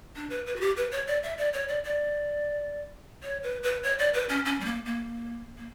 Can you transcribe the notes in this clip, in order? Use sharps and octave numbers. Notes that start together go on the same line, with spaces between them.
D4
B4
B4
F#4
G4
B4
C#5
D5
E5
D5
C#5
D5
D5
C#5
B4
B4
C#5
D5
B4
C#4
C#4
G3
A#3
A#3
A#3